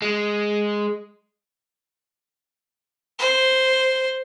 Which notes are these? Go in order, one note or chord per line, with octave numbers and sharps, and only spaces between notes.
G#3
C5